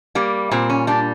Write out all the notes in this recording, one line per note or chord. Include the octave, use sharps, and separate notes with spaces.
G3 A#3
A#2 C4
C#4
G3 D4